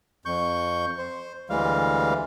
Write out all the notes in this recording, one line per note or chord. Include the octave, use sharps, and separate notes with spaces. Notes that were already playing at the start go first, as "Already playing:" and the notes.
F2 C#6 G6
C5
D2 E3 G3 G#3 F5